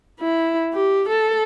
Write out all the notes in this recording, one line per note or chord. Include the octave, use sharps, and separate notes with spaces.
E4
G4
A4